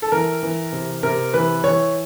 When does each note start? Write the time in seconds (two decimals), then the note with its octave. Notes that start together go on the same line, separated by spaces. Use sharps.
0.02 A4
0.12 E3 A#4
0.43 E3
0.72 C3
1.03 C3 A#4
1.34 E3 B4
1.64 E3 C#5